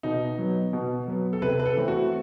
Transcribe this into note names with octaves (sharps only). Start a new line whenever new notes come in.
B2 D#4
F#3 B3
B2
F#3 B3
A4
C3 B4
B4
A4
E3 A3 C4
F#4